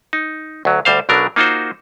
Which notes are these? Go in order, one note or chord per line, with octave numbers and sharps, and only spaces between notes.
D#4
D2 F#3
D2 G3 C5 F5
B1 B2 F#3 D4 A#4
A#3 D#4 F4 F#4 C5